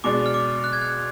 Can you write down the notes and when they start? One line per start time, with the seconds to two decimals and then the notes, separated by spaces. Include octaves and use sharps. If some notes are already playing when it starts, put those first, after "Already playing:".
0.04 B2 G#3 D4 D6
0.26 F6
0.34 D6
0.64 F#6
0.73 G#6
0.82 F#6